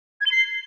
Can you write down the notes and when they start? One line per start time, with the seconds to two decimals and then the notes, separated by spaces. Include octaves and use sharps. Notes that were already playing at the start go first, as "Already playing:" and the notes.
0.21 G#6
0.26 G7
0.32 C7